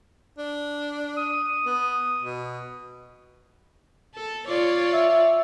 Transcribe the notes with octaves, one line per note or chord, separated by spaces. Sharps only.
D4
D#6
B3
B2
A4
F4 C#5 D5
E5